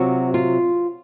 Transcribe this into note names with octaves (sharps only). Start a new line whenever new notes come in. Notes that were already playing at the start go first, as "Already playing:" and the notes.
Already playing: C3 F#3 C4 F4 F#4
F4